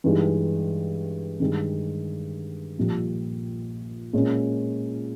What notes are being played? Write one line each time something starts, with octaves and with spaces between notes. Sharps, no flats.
G2 E3 G#3 D#4 G4
G2 D#3 G#3
A#1 A#2 G3
A#2 G#3 C#4